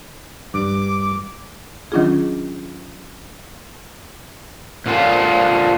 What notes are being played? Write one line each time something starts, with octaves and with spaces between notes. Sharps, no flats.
G2 D6
D#3 F#3 C#4 D4 F4 G#4
A#2 D3 F4